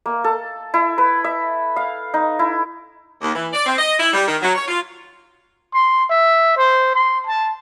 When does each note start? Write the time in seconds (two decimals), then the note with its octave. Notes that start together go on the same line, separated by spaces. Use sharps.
0.06 A#3
0.24 A4
0.74 E4
0.98 B4
1.24 E5
1.76 F5
2.14 D#4
2.39 E4
3.22 D#2
3.35 E3
3.53 D5
3.66 C4
3.79 D#5
4.00 E4
4.13 G3
4.28 D#3
4.41 F#3
4.55 C#5
4.68 F4
5.74 C6
6.10 E5
6.57 C5
6.95 C6
7.27 A5